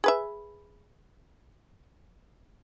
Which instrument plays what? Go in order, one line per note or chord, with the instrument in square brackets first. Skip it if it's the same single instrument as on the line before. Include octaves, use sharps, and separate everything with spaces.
[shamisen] G#4 B4 E5